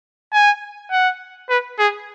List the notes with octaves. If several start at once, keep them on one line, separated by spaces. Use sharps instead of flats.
G#5
F#5
B4
G#4